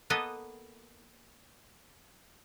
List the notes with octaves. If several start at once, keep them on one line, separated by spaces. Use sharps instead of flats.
A#3 B3 A4 B4 D#5